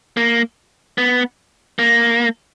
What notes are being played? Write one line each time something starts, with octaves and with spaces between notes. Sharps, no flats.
A#3
B3
A#3